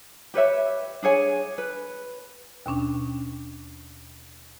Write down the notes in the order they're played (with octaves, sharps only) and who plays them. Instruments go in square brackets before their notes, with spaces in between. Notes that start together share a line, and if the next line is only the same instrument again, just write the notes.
[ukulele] G4 B4 C#5 E5
D4 G#4 C#5 G#5
B4
[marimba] D#2 B2 C#4 D4